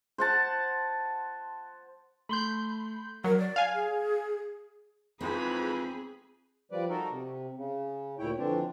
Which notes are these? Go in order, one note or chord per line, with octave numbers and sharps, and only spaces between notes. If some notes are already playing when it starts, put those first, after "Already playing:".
C5 F#5 A5
A3 B5 C6 G6
F#3 A#4
D5
F5 G#5
G#4
F2 G#2 E3 C4 G#4 B5
F3 G3 B4 D5
D#4 F#4 A4 A#4
C3
C#3
D2 A#2 E4 C#5 G5
F2 D3 E3 C4 D4